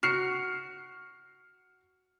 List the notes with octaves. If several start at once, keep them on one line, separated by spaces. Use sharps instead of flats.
F#4 F6 C7 C#7